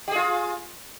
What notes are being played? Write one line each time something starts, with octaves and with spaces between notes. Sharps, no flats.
F4 G4 G#4